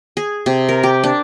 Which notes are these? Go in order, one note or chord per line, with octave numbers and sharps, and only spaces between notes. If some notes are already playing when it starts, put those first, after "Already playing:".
G#4
C3
A#4
G4
D4